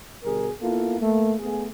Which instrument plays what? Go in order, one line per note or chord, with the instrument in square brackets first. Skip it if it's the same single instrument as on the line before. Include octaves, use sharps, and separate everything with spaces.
[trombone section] B2 D3 G3 G#4 A#4
A#3 B3 E4 F4 A4
A3 A#3
A3 B3 G#4